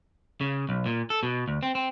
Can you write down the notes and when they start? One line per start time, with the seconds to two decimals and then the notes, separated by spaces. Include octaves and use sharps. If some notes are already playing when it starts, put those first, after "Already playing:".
0.41 C#3
0.69 B1
0.86 A#2
1.10 A4
1.23 B2
1.48 D2
1.63 C4
1.75 C4